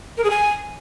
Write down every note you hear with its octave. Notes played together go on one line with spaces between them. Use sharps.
A#4
G#4
G#5